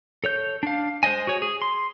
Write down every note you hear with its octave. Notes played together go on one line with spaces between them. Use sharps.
A4 C#5 G6
D4 F5
G#3 C5 D5 D#5 G#5
F#4 G#4 C#5
G#4
C6